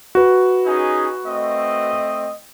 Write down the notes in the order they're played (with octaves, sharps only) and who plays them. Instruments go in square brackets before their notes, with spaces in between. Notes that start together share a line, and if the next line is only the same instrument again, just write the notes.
[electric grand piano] F#4 B4
[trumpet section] C#4 D#4 G#4
A3 C4 D#5